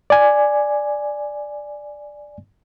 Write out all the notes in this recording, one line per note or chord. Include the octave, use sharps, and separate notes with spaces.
D5 G#5